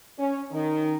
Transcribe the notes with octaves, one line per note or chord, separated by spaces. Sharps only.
C#4
D#3